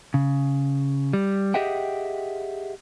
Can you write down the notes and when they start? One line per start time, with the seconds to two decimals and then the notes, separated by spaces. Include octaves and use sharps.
0.14 C#3
1.13 G3
1.54 G4 G#4 D#5 E5 F#5 G5